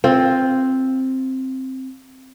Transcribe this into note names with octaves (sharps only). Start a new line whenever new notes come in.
C4 F4